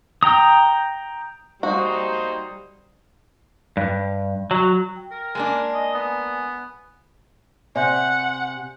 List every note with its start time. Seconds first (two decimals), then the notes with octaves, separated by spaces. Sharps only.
0.23 G5 A#5 D#6
1.63 G3 A#3 D#4 F#4 C5
3.77 G2
4.51 F#3
4.96 G5
5.11 A#4
5.35 G#3 A#3 D4 G#5
5.74 D#5
5.94 B3
7.76 C3 D5 E5 F#5 G#5 C6 G6